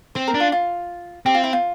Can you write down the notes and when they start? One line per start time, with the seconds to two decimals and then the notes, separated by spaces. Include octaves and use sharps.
0.15 C4 C5
0.28 A#4
0.34 D4
0.40 F4
0.52 F4
1.26 C4 G4
1.35 F4
1.44 E4
1.53 F4